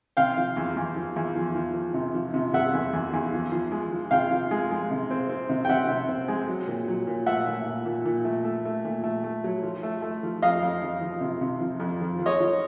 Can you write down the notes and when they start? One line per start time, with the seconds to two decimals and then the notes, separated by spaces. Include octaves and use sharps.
0.17 C3 F5 G5
0.37 F3
0.56 E2
0.77 E2
0.96 F3
1.16 E2
1.36 F3
1.55 F3
1.75 F3
1.94 C3
2.14 F3
2.34 C3
2.53 C3 E5 F#5
2.74 E2
2.93 E2
3.13 E2
3.33 F3
3.52 F3
3.72 G#3
3.92 F3
4.11 C3 F5 G5
4.31 F3
4.51 G#3
4.71 G#3
4.91 C3
5.11 C4
5.29 C4
5.49 C3
5.65 G5
5.69 C3 E5 F#5
5.88 C3
6.09 C4
6.28 G#3
6.48 F#3
6.67 A#2
6.88 F#3
7.07 A#2
7.26 A3 E5 F#5
7.46 A#2
7.66 A#2
7.85 A#2
8.05 A#2
8.25 A3
8.44 A3
8.65 A3
8.85 A#2
9.04 A3
9.24 A3
9.44 F#3
9.63 F3
9.83 A3
10.02 A3
10.23 F3
10.42 F2 D#5 F5
10.62 F2
10.82 F3
11.02 F3
11.21 C3
11.41 C3
11.60 F3
11.80 F2
12.00 F3
12.19 F3
12.26 C#5 D#5
12.40 F3